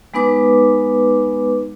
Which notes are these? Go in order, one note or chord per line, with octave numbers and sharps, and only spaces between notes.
G#3 B3 D#4 B4 D6